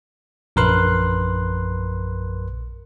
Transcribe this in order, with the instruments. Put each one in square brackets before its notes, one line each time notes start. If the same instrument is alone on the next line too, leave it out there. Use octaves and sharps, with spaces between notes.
[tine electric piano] A#1 F#2 A#4 B4 C6 F#6